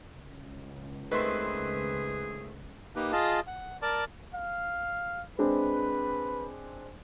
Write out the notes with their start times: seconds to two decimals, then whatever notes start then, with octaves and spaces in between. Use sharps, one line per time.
0.16 C#2
1.12 D#3 A3 C4 G#4 B4 C6
2.96 A#3 D#4 G4 B4
3.12 F4 G#4 D#5 F5 A5
3.47 F#5
3.82 A#4 D5 A5 D6
4.34 F5
5.39 G#3 C4 D4 B4